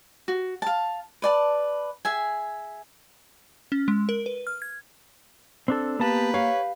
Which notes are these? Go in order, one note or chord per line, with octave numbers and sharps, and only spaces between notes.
F#4
F5 A5
B4 D5 A5
G#4 E5 G#5
C#4
G#3
A#4
B4
F6
G#6
C4 D4 A4
A#3 B3 G4 B4 A5
C#5 F5